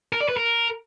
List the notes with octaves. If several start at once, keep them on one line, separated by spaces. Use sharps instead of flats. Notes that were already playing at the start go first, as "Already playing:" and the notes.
A#4
D5
B4
A#4